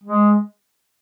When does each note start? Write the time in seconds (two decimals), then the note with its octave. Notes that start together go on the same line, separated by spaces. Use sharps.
0.03 G#3